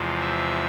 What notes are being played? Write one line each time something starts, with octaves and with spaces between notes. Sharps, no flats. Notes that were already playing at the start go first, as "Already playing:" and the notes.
Already playing: E2 C3 F3 G#3
E5